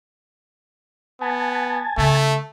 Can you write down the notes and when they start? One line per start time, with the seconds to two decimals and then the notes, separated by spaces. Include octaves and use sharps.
1.21 B3 G#5 A5
1.98 C#3 A3